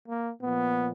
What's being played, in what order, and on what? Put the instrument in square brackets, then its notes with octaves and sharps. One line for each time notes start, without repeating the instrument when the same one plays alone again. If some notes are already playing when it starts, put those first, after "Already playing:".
[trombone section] A#3
A#2 F3 B3